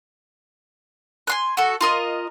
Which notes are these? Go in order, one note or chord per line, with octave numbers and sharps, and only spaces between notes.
G#5 C6 F#6
F#4 A4
F4 A#4 D#5